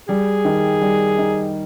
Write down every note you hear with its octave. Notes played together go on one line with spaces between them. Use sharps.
G3 G#4
D#3
G3
D#4